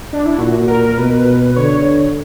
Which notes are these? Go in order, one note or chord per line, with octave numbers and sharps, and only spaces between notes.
D4
E4
A#2 F#4
A#4
B2 B4
D3 C#5